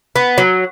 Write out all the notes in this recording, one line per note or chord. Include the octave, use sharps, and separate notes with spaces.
B3
F#3